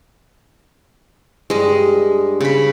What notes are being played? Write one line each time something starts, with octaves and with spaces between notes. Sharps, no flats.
G2 G#3 D#5
C#3 B5